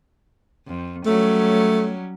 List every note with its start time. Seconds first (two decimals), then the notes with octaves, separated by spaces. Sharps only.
0.67 F2
1.06 F#3 G3 A3 C#4